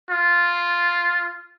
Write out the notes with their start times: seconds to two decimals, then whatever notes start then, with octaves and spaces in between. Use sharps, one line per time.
0.10 F4